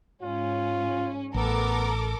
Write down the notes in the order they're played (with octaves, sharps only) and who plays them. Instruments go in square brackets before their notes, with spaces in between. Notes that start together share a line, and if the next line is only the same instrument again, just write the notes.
[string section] G#2 C#4 [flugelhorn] F4
[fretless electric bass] A1 [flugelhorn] B3 [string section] A4 A#4 D6